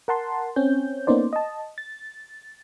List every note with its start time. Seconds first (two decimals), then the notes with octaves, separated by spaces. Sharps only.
0.08 A#4 F#5 A5 C6
0.56 C4 C#4 G6
1.07 A#3 B3 C#4 D#4 C5 D5
1.33 D#5 A5
1.78 A6